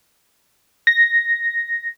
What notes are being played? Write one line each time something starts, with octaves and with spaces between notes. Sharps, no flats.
A#6